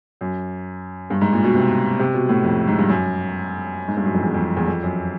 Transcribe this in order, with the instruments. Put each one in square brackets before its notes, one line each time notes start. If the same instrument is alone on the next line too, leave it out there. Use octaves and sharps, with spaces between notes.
[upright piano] F#2
G2
G#2
A#2
B2
C3
C3
B2
A2
F2
G#2
G2
F#2
G#2
G2
F#2
F2
E2
F2
E2
F2
F#2